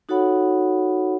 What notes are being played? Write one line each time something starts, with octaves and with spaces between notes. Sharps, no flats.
D#4 F#4 A4 C#5 F#5 B5